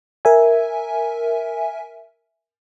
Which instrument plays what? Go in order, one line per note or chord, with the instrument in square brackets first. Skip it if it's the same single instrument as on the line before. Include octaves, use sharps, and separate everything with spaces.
[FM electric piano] A#4 E5 G#5